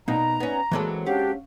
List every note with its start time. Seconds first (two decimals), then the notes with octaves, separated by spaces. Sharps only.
0.08 B2 A#3 D#4 A#5
0.40 B3 C#4
0.71 E3 F#3 G#3 A#3 C4 A4
1.06 C#4 D4 G4 F5 F#5